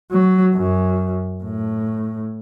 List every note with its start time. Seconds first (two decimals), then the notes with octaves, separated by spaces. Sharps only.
0.12 F#3
0.54 F#2
1.44 A2